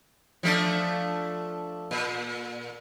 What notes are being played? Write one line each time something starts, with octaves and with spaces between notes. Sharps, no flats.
F3 A3 D4
A#2